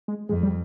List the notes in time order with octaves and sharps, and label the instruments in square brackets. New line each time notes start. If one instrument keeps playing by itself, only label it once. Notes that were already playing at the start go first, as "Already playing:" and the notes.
[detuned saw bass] G#3
[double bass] F2 [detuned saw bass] G#3
[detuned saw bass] G3